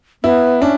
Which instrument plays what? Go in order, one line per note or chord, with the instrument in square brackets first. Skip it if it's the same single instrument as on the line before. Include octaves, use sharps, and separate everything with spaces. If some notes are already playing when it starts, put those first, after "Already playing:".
[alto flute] B3 [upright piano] E4
[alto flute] C#4 [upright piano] D4